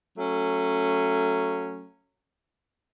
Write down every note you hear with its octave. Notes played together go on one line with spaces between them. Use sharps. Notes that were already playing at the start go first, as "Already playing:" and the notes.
F#3 A3 C#4